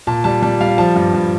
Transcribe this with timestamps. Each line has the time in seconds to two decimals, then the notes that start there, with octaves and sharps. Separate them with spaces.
0.07 A#2 A5
0.24 G3 A5
0.42 G3 A5
0.60 G3 F5
0.78 F3 A5
0.96 G2
1.14 G2